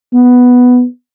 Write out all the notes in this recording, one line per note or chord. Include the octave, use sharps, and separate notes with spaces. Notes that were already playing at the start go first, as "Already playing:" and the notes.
B3